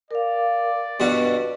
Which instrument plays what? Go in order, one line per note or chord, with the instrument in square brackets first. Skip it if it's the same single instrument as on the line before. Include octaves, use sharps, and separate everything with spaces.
[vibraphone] A#4 F5 [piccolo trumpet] D5
[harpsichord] G2 B2 F#4 [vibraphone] B4